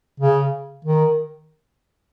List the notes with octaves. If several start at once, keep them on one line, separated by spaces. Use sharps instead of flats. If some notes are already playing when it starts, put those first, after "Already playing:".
C#3
D#3